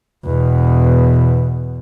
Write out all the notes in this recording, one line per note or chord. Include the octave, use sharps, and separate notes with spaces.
E2 B2